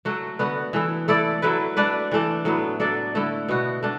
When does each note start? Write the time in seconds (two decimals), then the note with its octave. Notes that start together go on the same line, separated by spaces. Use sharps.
0.05 F#3 A3 F#4
0.39 D3 B3 F#4 B4
0.73 E3 A3 E4
1.08 A3 E4 A4 D5
1.42 F#3 A3 E4 B4
1.77 A3 D4 B4 D5
2.12 E3 A3 D4
2.45 A2 F#3 B3
2.80 F#3 D4 A4 D5
3.15 D3 A3 E4
3.48 B2 B3 F#4
3.83 A3 D4